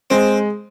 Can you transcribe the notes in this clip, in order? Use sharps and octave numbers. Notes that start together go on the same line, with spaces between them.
G#3 C4